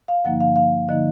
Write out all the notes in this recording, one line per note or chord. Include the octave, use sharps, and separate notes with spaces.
F5
G2 D3 F3 A#3 D#4 F#5
F5
F5
D3 F3 A#3 D#4 D#5